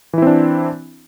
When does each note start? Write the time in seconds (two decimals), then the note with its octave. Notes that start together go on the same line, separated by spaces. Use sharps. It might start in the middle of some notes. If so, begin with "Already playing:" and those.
0.13 E3
0.18 E4
0.22 C4
0.27 D4